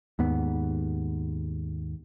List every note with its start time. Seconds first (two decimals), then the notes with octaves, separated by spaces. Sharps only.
0.19 D#2 G#2 B3